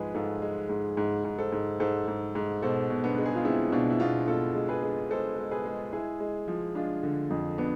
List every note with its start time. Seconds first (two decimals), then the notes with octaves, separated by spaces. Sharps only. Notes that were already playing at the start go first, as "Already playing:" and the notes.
Already playing: G#2 F3 G#3 G#4 B4
0.14 G#2 F4 A4
0.42 G#3
0.69 G#2
0.97 G#2
1.25 G#2
1.39 A4 C5
1.52 G#2
1.80 G#2 A4 C5
2.08 G#2
2.35 G#2
2.62 B2 A4 C5
2.90 B2
3.04 B3 D4
3.18 G#3
3.26 G#4
3.35 F4
3.45 G#3 C4 E4
3.72 B2 D4 F4
3.90 E4
4.00 B2 D4 F4
4.27 B2 F4 A4
4.55 G#3
4.68 G#4 B4
4.83 G#3
5.11 G#3 A4 C5
5.38 G#3
5.51 G#4 B4
5.66 G#3
5.92 G#3 E4 G#4
6.20 G#3
6.48 F3
6.75 G#3 D4 F4
7.03 D3
7.30 F2
7.58 B3 D4